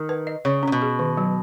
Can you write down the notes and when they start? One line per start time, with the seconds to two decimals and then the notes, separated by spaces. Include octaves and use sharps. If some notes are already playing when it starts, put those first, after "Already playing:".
Already playing: D#3
0.09 B4
0.27 D#5
0.45 C#3 C#5
0.63 C#3 C#4
0.72 B2
0.82 G#4
0.99 D#3
1.17 F#3